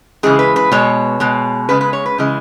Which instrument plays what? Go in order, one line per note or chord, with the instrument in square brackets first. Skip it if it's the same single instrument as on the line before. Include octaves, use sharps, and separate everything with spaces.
[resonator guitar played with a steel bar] C#3 E3 G#3 G#4
B4
B4
B2 G#3 C#5
B2 G#3
C#3 G#3 B4
B4
C#5
B4
C#3 E3 G#3